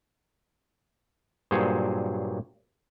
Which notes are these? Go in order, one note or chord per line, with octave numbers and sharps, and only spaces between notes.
G2 A#2 F#3 G#4 C5 C#5